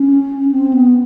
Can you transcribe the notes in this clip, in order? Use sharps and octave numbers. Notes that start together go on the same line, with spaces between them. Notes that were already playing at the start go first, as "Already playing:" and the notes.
Already playing: C#4
C4
B3